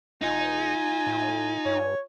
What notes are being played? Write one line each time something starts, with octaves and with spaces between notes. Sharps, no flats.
E1 D#4 F4 G#5
A2
G2 C#5